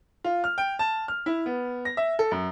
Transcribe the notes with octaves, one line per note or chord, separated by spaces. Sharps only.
F4
F6
G5
A5
F6
E4
B3
A#6
E5
A4
F#2